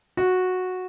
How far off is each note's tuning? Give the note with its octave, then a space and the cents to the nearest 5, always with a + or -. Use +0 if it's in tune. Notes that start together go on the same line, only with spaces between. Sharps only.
F#4 -10